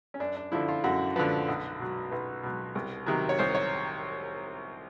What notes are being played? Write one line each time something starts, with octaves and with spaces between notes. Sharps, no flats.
C#4
F#2 D4
D4
D3 F3 E4
F4
F#2 F#4
D3 F3 B4
B1
B2 F#3
B1 B4
B2 F#3
C2
C3 D#3 F#3
C#5
C2 C5
C#5